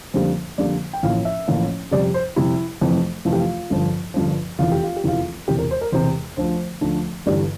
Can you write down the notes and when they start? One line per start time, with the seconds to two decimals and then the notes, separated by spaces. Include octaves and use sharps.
0.14 F2 D3 G3 A#3 C5
0.58 F2 D3 G3 A#3 D5
0.93 G5
1.03 A1 A2 F3 A#3 F5
1.25 E5
1.47 A1 A2 F3 A#3
1.91 F2 C3 G3 D5
2.14 C5
2.36 F2 C3 G3 E4
2.81 F2 C3 E3 A3
3.25 F2 C3 E3 A3 F4
3.33 G4
3.40 F4
3.70 G1 G2 F3
4.14 G1 G2 F3
4.59 F1 E2 E3 F4
4.72 G4
4.83 F4
4.96 G4
5.04 F1 E2 E3 F4
5.48 E1 E2 C3 G4
5.59 A#4
5.71 C5
5.81 A#4
5.92 E1 E2 C3 C5
6.37 D2 D3 F3 A3 C5
6.81 D2 D3 F3 A3
7.26 G1 G2 E3 G3 D5